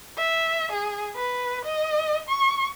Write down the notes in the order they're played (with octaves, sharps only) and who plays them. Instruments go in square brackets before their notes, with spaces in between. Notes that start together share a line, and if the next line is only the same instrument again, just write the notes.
[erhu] E5
G#4
B4
D#5
C#6